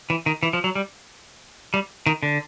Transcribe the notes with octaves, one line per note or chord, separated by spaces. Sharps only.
E3
D#3
E3
F3
F#3
G3
G3
D#3
D3